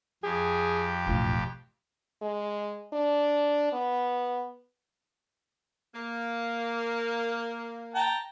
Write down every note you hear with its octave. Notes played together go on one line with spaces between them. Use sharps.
F2 G4 G#4
E1 A1 F4
G#3
D4
B3
A#3
G5 A5 A#5